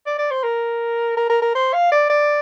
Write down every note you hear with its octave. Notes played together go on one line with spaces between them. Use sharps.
D5
D5
C5
A#4
A#4
A#4
A#4
C5
F5
D5
D5